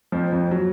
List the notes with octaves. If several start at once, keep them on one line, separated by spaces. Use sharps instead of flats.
F2 F3
F2 F3
F#3